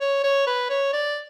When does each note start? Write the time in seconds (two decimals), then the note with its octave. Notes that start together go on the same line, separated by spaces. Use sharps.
0.01 C#5
0.24 C#5
0.47 B4
0.70 C#5
0.93 D5